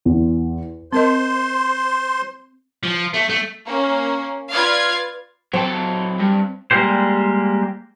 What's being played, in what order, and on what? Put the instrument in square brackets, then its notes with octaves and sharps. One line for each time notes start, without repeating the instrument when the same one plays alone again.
[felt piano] E2
[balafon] C4 A#4 D#5 [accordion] C5 C6
[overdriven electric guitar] F3
A3
A3
[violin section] A#3 C#4
F4 B4 D5 F5 G#6
[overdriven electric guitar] F#3 A4 [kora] C4
[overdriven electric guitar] G2
[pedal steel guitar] G3 G#3 A#3 G4 C5